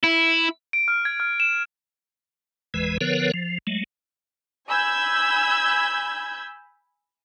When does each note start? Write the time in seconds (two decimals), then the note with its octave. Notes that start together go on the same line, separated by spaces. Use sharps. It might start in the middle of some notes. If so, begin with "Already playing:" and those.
0.04 E4
0.73 D7
0.88 F6
1.05 G#6
1.20 F6
1.40 E7
2.74 G1 E2 E3 G#3 B4
3.01 D3 F3 B3 A#4 B4 C#5
3.34 F3
3.67 F#3 G#3 A3
4.67 G#5 B5 E6 G6 G#6